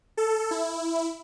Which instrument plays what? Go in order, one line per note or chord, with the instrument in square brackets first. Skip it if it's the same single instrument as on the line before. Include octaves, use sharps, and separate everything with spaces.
[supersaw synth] A4
E4